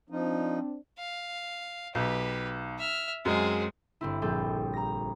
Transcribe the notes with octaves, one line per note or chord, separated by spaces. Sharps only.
F3 C4 D4 D#4
F5
B1 G4 B4
E5 F6
F#2 G#3 C4 G#4
G1 C4 E4
A#1 G3 C4 A4 G6
A#5 A#6